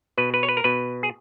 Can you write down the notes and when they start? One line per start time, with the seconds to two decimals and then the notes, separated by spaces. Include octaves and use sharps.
0.18 B2 B4
0.34 B4
0.43 C#5
0.49 B4
0.57 A#4
0.64 B2 B4
1.03 G#4